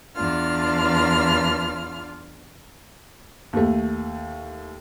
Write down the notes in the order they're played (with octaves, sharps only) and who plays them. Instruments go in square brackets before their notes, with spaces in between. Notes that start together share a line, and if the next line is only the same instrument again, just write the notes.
[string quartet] E2 D4 F4 F6
[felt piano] D#2 A3